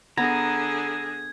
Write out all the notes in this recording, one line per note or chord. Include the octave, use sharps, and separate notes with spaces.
D3 B3 G#4 A#5 G#6